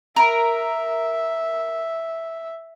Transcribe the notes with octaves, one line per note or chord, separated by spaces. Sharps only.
A#4 E5